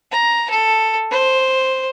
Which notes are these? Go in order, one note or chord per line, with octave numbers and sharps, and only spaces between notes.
A#5
A4
C5